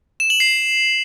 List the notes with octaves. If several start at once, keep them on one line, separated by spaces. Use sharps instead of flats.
E7
F#7
C7